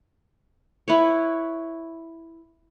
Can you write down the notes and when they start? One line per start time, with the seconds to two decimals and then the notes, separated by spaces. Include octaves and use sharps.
0.88 E4 B4 C#5